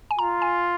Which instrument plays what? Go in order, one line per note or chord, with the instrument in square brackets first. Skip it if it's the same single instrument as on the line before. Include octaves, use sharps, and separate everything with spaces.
[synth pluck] G#5
[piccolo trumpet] F4 [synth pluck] A#5
[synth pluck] G#5